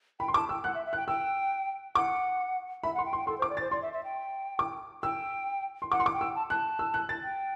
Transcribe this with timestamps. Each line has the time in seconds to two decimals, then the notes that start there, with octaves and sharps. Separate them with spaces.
0.20 G5 B5
0.28 C6
0.34 A5 D6
0.49 G5 E6
0.64 F#5 F#6
0.75 E5
0.86 E5
0.93 F#6
0.96 G5
1.08 G5 E6
1.95 F#5 D6
2.83 E5 B5
2.94 F#5
2.98 C6
3.06 G5
3.13 C6
3.17 G5
3.27 A4 C6
3.39 C5
3.42 D6
3.50 D5
3.57 A6
3.61 C5
3.71 D5 C6
3.82 E5
3.93 E5
4.04 G5
4.59 D6
5.03 G5 E6
5.82 C6
5.91 F#5 D6
6.00 C6
6.06 D6
6.14 G5
6.21 E6
6.36 A5
6.50 A5 F#6
6.79 E6
6.94 F#6
7.09 A6
7.23 G5